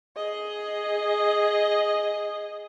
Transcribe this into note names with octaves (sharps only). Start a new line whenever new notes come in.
G#4 D#5